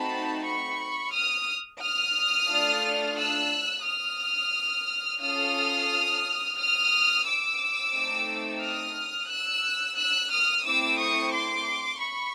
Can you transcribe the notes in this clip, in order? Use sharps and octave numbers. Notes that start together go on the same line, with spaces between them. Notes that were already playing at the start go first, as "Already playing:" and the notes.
Already playing: A3 C4 D#4 F#4 A5 B5
B5 C#6
D#6 F6
D#6 F6
A3 D4 F4 A4
E6 F#6
D#6 F6
C#4 F4 A4 D#6 F6
D#6 F6
D6 E6
A3 C4 D#4
D#6 F6
E6 F#6
E6 F#6
D#6 F6
A3 C4 E4 D6 E6
C#6 D#6
C6 D6
B5 C#6